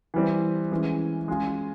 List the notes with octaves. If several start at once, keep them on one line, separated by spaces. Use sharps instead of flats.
E3 G3 C4
E3 G#3 C#4
G#3 C#4 F4 G#4